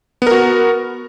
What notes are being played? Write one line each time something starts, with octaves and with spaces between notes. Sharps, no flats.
B3 F#4 A#4